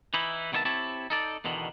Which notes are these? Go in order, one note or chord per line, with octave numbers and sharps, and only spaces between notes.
E3 D#4 E4
C2 D#3 B3 C#5 E5 A5
C4 E4 G4 C#5 A5
D#4 A4 D5
E2 B2 D3 D#3